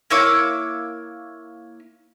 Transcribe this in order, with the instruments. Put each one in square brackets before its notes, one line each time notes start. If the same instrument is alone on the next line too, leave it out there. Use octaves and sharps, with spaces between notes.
[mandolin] A#3 E4 C#5 D6